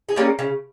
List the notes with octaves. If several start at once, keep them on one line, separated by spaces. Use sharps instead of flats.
G#4
G3 A#3 C#4
C#3